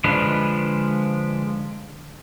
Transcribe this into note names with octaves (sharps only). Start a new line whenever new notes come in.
D3 F3 G#3 D4 B4